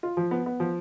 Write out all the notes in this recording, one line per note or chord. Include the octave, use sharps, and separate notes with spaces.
F4
F3
B3
B3
F3